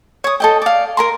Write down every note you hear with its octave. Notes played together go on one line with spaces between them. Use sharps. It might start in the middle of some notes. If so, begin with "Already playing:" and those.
C#5 D#6
A4 D#5 G5
D5 F5
A#4 A#5 C6